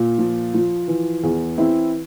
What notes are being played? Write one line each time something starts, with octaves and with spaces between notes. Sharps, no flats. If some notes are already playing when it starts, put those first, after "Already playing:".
Already playing: A#2
F3
F3
E3
E2
E3 C4 E4